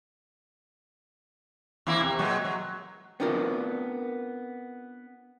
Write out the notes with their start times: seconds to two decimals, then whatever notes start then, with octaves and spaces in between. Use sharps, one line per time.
1.87 E2 A#3 E4
2.01 C3
2.19 A#2 F#3 G#3
2.44 F#3
3.20 B3 C4 D4 F4 A#4